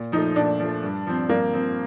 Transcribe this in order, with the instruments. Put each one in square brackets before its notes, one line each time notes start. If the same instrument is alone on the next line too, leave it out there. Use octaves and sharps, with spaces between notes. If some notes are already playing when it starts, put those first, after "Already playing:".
Already playing: [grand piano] A#2
[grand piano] F3 A3 [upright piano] D#4
[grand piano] A#2 [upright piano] D4
[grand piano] F3 A3
G2
F3 C4
[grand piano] G2 [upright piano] A#3
[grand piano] F3 C4